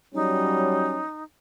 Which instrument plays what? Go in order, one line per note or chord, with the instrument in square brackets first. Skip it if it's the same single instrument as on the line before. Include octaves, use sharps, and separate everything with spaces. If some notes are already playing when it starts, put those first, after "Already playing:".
[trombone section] F#3 G3 C#4 [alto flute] D#4